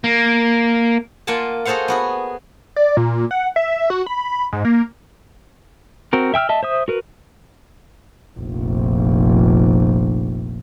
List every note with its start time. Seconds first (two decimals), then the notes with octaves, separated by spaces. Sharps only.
0.04 A#3
1.27 A#3 F4 F#5 G#5 A5
1.65 F#4 G#4 A4 C5 F5 F#5
1.88 B3 F#4 G#4
2.76 D5
2.97 A#2
3.31 F#5
3.56 E5
3.90 F#4
4.06 B5
4.53 G#2
4.65 A#3
6.13 C4 F#4 A#4
6.34 E5 G5 E6 F6
6.49 D#5 E5 A5
6.63 C5 E5 D#6
6.88 F#4 A#4 B4
8.39 F1 A#1